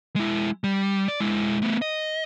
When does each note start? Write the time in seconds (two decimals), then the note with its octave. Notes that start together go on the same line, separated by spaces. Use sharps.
0.16 G#3 E4
0.64 G3
1.08 D5
1.20 G#3 E4
1.62 A3 B3
1.82 D#5